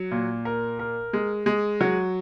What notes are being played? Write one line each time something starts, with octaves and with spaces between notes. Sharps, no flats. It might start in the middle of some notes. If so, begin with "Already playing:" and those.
Already playing: F#3
A#2
A#4
A#4
G#3
G#3
F#3